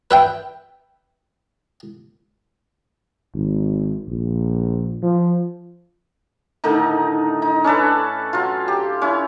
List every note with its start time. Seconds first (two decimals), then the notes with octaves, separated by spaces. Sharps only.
0.11 B4 E5 G5
3.34 G#1
4.08 A#1
5.03 F3
6.64 A2 D3 D#3 D#4
7.42 D#4
7.64 C#4 D4 A4 B4
8.33 F#3 F4
8.68 G4
9.02 C#4 E4